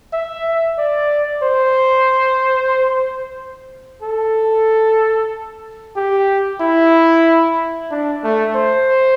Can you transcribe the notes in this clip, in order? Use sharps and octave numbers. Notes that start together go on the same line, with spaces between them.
E5
D5
C5
A4
G4
E4
D4
A3
C5